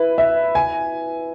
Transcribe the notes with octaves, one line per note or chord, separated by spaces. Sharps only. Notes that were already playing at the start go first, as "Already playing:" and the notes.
Already playing: E4 B4
E5
G#5